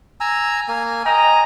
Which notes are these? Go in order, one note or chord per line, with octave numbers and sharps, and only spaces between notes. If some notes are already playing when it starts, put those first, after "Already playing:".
G#5 A#5 E6
A#3 G#5
D#5 G5 G#5 A#5